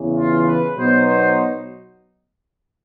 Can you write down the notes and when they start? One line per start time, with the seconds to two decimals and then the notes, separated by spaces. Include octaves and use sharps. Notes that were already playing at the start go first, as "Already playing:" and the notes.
Already playing: E2 C#3 E3
0.16 F4
0.46 B4
0.76 B2 F#3 B3 D#4 C5
1.06 C5